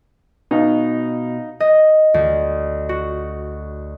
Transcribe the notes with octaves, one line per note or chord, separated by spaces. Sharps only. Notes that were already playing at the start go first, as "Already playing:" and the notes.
B2 D#4 F5
D#5
D2
F#4